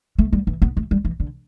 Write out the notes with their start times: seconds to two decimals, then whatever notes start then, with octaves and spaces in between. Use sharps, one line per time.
0.19 A3
0.33 G3
0.47 E3
0.62 B3
0.77 A3
0.91 G3
1.05 E3
1.20 D3